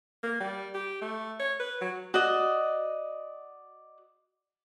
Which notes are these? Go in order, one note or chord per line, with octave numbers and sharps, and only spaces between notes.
A#3
G3
G4
A3
C#5
B4
F#3
F#4 D5 D#5